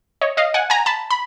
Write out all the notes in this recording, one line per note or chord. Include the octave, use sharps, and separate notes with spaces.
C#5 D#5
D#5 F5
F#5 G#5
G#5 A#5
A5 B5
B5